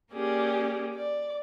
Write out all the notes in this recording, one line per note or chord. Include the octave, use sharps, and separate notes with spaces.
A#3 C#4 G4 G#4 D5
D5